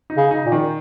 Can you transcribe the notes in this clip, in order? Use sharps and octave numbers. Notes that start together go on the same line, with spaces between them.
D#4
C#3
D#4
A#2
D#3